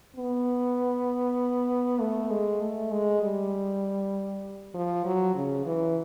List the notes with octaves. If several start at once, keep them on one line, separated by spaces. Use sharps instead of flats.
B3
A3
G#3
A3
G#3
G3
F3
F#3
C#3
E3